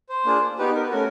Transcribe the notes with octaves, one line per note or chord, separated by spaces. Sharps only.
C5
A#3 D4 F4 G#4
B3 D#4 G4 B4
A#4
B4
A3 C#4 F#4 A#4